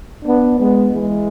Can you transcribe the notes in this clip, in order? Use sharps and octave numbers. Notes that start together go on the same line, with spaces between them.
B3 D4
G#3 B3
E3 G#3